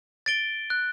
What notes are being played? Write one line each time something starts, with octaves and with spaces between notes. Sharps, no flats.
A6 D7 G7
F#6